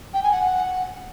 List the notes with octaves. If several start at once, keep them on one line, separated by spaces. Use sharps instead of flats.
G5
G#5
F#5